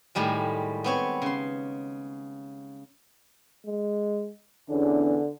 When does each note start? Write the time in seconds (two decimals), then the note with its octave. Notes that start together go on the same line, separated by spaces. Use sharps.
0.15 A2 D#3 G3 G#3
0.84 B3 C4 C#5
1.22 C#3 C6
3.66 G#3
4.69 E2 D3 C#4 D4